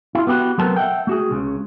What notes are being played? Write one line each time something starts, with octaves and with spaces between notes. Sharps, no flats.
E4 F4
B3 F#4 G4 B4
F#3 A3 B3 C4 A#4 A5
E5 F#5 G5
A3 F#4 G#4
C#2 A#2 C#3